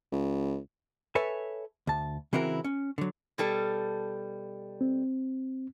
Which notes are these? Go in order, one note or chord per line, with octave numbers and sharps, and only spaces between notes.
C#2
A4 B4 C#5 E5 G#5
D2 A5
C#3 E3 C4 E4 F#4 A#4
C#4
D3 F#3
B2 G3 A4
C4